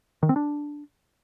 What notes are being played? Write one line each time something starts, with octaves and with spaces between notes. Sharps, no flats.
D#3
C4
D4